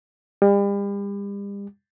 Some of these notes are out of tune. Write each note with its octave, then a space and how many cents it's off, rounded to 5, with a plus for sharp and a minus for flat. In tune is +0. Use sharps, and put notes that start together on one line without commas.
G3 +40